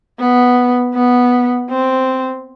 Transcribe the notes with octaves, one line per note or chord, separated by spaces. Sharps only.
B3
B3
C4